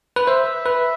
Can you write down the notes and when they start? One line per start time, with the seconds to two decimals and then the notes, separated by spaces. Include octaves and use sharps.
0.16 B4
0.27 C5 E5
0.65 B4